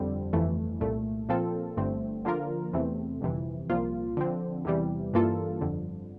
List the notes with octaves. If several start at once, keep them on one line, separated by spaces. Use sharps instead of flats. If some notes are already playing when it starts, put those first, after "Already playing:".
Already playing: G1 F2 D3 G3 C4
G1 F2 E3 A3
C2 A#2 A3
A#2 F3 C4 F4 A4
G1 G2 D3 A3 C4
D3 F3 A#3 F4 A#4
E2 C3 E3 A3 C4
G1 F2 C3 E3
C2 A#2 F3 A#3 F4
D3 F3 C4
E2 C3 E3 G3
G2 E3 A#3 F4 A4
G1 F2 D3